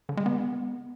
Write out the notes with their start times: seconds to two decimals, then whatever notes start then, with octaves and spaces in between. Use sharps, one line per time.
0.09 D3
0.17 G#3
0.26 B3